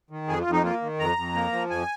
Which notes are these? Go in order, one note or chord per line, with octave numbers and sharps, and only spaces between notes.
D#3
F2 G#4
F4
F2
D#4
A#3 F4
D#3
F2 A#5
F2
A#3
F3
F2 G#5